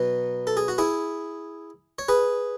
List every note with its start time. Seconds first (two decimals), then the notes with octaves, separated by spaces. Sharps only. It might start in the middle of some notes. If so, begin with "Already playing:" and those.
Already playing: B2 F#3 B3
0.47 A4
0.57 G#4
0.68 F#4
0.78 E4 G#4
1.99 C#5
2.08 G#4 B4